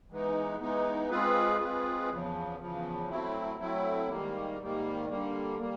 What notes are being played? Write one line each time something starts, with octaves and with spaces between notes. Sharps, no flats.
E3 G#3 B3 D#4
E3 G#3 B3 D#4
G#3 C4 F4 G#4 B4
G#3 C4 F4 G#4 B4
E2 C#3 F3
E2 C#3 F3
F#3 A3 C4 E4
F#3 A3 C4 E4
G#2 D#3 G3 A#3
G#2 D#3 G3 A#3
D3 G3 A#3
G3 A#3